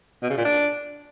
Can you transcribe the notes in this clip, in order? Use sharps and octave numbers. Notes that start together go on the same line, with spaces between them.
B2
C#3
A#2
D4